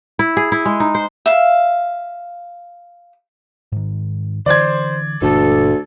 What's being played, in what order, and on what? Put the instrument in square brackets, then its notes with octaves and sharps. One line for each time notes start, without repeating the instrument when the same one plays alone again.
[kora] E4
G#4
E4
G#3
D#4
C5
[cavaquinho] E5 F5
[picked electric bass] G#2 D#3
[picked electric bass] D3 E3 [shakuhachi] C5 [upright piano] D5 G#6
[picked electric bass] F#1 A#2 E3 [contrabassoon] D2 [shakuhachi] A4